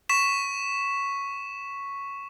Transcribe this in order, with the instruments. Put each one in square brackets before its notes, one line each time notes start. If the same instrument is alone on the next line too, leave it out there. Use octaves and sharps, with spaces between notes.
[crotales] C#6 B6 E7